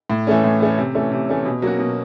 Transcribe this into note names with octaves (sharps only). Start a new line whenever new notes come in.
A2
E3 A3 C#4
A2
E3 A3 C#4
C3
E3 A3 C#4
C3
E3 A3 C#4
B2
F#3 A#3 C#4 F#4
B2